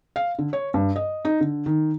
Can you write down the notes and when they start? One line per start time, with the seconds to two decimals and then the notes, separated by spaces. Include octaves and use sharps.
0.16 F5
0.39 D3
0.53 C#5
0.74 G2
0.96 D#5
1.25 D#4
1.40 D3
1.66 D#3